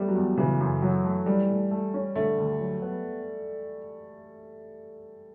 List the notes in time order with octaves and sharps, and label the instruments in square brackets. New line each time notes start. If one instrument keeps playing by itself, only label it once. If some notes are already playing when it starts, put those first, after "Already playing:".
Already playing: [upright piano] G3 [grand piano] A3 B3
[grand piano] F#3
[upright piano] E2
[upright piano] C#3 [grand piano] E3
[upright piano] F#2
F#3
A3
[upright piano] E3 [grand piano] G3
[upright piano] A2
A3
C#4
[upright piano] D3 [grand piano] A3
[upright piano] D2
F#3
B3